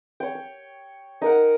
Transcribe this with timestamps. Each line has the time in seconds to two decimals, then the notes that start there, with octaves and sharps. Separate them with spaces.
0.20 C#5 G5
0.35 C#6
1.22 D#4 A#4 F#5